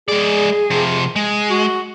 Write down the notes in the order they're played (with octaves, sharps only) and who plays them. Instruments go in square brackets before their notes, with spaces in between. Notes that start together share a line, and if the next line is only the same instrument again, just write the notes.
[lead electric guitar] G#3 D5 [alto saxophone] G#4
[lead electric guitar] C3 F3
G#3
[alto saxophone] F#4